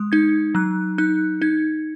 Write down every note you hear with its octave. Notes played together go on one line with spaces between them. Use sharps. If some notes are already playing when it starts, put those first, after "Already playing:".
Already playing: G#3 D#6
D#4 G#6
F#3 F#6
D#4 F#6
D#4 G#6